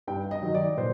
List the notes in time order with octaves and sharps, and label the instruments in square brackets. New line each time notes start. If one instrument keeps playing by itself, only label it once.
[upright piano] G2 G5
D#5
D#3 F#3
D5
A#2 C5